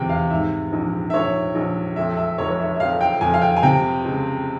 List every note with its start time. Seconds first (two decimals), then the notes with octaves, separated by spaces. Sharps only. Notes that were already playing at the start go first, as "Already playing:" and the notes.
Already playing: F1 E2 C3 G5
0.09 F5
0.30 G#2 E5
0.73 A#1
1.10 E5
1.14 A#1 C#5
1.55 A#1
1.96 F2 E5
2.17 E5
2.38 F1 C#5
2.49 C#5
2.59 E5
2.74 E5
2.80 F2 F5
3.01 G5
3.21 F2 G#5
3.34 F5
3.41 G5
3.57 G#5
3.63 C3 G5
4.05 C#2